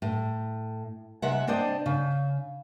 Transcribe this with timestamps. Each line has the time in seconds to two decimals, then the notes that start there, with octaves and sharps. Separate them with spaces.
0.02 A2
1.22 C3 G#3 E5 F#5
1.47 C4 D4 C5 D5 D#5
1.86 C#3